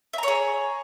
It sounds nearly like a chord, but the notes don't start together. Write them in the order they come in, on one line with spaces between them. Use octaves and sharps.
E5 A#5 C#5 G#4